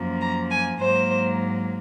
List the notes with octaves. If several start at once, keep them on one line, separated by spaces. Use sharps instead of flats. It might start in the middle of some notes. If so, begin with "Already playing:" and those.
Already playing: F#2 F3 A#3
A#5
G#5
G#2 F#3 A#3 C5